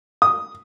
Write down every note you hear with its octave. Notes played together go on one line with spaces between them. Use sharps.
D#6